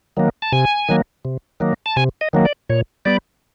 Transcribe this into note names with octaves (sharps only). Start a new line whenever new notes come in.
D#3 F#3 A#3
A5
C3 G#5
D#3 F#3 A#3
C3
D#3 F#3 A#3
A5
C3 G#5
D#5
D#3 F#3 A#3
D5
A#2 C#5
G3 B3 D5